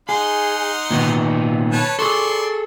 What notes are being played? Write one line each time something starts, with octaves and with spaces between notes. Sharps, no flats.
D#4 G#4 F#5 C6
A#2 D#3 B3
B4 C#5 A5
G#4 A4 D5 C6 C#6